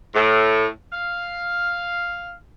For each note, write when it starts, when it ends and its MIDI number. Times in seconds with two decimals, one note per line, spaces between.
0.14 0.65 45
0.91 2.30 77